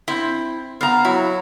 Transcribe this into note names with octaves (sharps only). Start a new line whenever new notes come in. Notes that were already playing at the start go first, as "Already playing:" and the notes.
C4 E4
B3 F5 A#5
F#3 E4